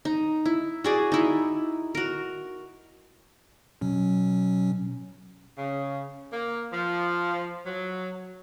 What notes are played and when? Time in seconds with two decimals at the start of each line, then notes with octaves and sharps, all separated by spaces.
0.05 D#4
0.46 E4
0.84 F#4 G#4 D5
1.12 D#4 E4
1.95 F#4 A#4
3.81 B2 F#3 C#4
5.58 C#3
6.33 A#3
6.73 F3
7.66 F#3